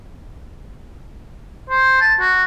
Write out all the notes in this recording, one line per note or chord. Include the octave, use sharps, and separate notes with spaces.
C5
A5
F#4